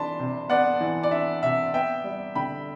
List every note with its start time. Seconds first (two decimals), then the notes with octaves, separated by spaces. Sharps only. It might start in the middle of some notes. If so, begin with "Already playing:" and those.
Already playing: E3 D4 A5 B5 C6
0.19 C3
0.50 B3 D5 F#5
0.81 E3
1.03 D5
1.11 D4 E5
1.43 C3 E5
1.74 B3 E5 G5
2.04 G3
2.35 D3 G5 B5